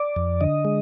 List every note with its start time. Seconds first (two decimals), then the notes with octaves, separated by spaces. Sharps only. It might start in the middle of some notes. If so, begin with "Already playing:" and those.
Already playing: D5
0.16 F2
0.41 D3 D#5
0.65 G#3